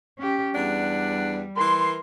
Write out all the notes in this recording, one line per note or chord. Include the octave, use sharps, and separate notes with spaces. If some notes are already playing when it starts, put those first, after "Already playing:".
C#4 G4
E2 G3 D4 F#5
E3 A#4 C6